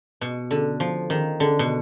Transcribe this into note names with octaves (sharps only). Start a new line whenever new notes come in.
B2
D3
F3
D#3
D3
B2